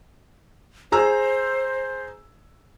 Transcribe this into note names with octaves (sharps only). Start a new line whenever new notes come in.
G#4 C5 A#5 E6